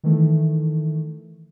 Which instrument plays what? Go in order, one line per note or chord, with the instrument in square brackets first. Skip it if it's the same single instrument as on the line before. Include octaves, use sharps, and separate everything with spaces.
[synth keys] D#3 E3 A3